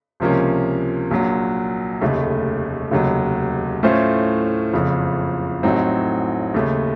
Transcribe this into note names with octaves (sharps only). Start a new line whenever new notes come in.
C#2 C3 F3 A#3 C#4
A#1 A#2 F#3
F1 D#2 C#3 A3
F1 D#2 C#3 F#3
A2 A3 C#4 F4 C5
F#1 F2 C#3 F3
A1 A2 F#3 C4 D#4
D#2 C#3 A3